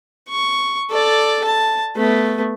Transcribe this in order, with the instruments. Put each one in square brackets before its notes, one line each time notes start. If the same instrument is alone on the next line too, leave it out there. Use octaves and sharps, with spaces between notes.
[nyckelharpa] C#6
A4 D5
A5
A3 B3